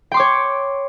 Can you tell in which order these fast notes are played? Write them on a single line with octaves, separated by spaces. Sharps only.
G5 C6 D6 C#5